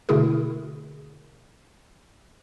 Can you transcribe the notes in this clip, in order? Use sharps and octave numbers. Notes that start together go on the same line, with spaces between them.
B2 D3 A3 E4 G#4 A#4